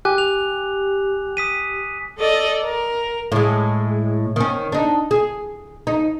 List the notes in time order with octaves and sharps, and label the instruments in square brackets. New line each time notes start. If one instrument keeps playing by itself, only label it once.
[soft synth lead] G4 [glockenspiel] G#5 D6 F#6
[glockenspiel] F7
D#6 B6 D#7
[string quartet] A4 D5 D#5
A#4
[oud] A2 G#3
D#3 C#4
D4 D#4
G#4
D#4